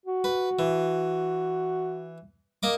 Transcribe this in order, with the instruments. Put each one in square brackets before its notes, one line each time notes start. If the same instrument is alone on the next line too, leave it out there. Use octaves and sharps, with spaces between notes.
[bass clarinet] F#4
[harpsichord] B4
E3
A#3 D#5 D6